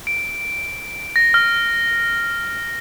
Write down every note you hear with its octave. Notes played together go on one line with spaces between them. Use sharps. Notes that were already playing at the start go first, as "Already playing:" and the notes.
D7
A#6
F6